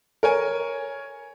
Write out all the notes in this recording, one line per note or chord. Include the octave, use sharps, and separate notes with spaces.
A#4 C#5 G#5